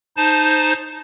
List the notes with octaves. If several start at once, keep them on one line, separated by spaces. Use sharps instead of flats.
D#4 C5 A5